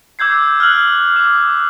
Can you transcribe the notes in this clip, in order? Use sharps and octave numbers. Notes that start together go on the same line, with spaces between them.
D6 E6 G6 G#6 C7
F6 F#6 F#7
D6